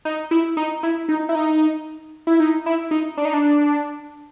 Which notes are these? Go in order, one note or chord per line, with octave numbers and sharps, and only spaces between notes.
D#4
E4
D#4
E4
D#4
E4
D#4
E4
D#4
E4
D#4
D4
D#4
D4